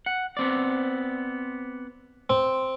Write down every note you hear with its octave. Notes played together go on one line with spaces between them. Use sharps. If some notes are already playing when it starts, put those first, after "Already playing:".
F#5
B3 C4 D5
C4